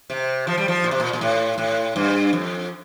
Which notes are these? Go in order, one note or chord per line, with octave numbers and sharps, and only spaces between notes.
C3
F3
G3
F3
A#2
C3
A#2
A#2
A2
A2
G2
F2